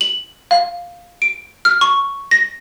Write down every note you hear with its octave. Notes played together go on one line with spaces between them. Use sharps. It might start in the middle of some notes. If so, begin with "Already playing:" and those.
F#7
F5
D7
F6
C#6
A#6